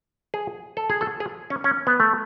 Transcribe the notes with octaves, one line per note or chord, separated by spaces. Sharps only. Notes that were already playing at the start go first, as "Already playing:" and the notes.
G#4
A4
G#4
A4
G#4
C#4
C#4
B3
A3